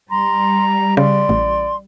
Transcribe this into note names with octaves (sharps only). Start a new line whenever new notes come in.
G3 A#5 C6
C#3 D5 C6
A1